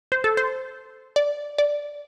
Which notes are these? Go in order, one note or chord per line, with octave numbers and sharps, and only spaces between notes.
C5
A4
C5
D5
D5